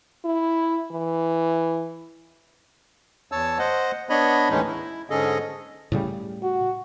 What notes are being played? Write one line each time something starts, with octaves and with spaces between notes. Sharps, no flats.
E4
E3
E2 C#5 A5 E6
C5 D#5 F#5
B3 D4 C#5 D#5 B5
D#2 A2 E3 G#3 C#4 D#4
E4
G#2 D3 C#4 G#4 A4 D#5
A2 C#3 G3
F#4